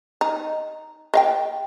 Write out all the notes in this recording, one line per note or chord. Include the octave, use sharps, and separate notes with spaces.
D#4
D#5 F5 G5